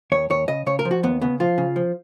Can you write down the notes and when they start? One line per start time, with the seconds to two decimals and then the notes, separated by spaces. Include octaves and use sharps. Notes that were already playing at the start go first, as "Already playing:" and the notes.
0.12 D#2 C#5
0.30 D#2 C#5
0.48 C#3 D#5
0.66 C#3 C#5
0.79 A#4
0.85 F3
0.91 F#4
1.03 D#2 B3
1.21 C#3 B3
1.40 F3 F4
1.58 C#3
1.76 F3